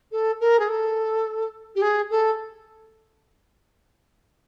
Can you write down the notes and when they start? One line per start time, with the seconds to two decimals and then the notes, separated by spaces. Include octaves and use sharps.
0.11 A4
0.40 A#4
0.59 G#4
0.68 A4
1.75 G4
1.81 G#4
2.10 A4